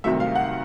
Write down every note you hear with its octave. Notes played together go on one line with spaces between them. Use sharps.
C2 C3 D#3 F#3 A3 E5
F5
F#5